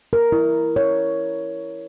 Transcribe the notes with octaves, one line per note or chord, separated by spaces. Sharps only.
A#4
E4
C#5